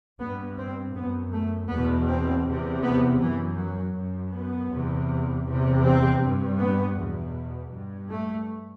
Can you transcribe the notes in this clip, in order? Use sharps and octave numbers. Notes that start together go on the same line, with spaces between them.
G2 B3
C4
F#2 B3
A3
E2 B2 B3
C4
E2 C3
B3
F#2 E3
F#3
F#2
B3
E2 C3
E2 C3
C4
G2
B3
E2 B2
G2
A3